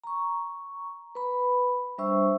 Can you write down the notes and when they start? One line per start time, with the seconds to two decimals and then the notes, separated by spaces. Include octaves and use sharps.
0.04 A#5 C#6
1.15 B4 B5
1.98 G3 D4 C5 E5 C#6 E6